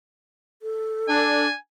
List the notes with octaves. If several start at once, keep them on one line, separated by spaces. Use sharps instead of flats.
A4
D4 G#5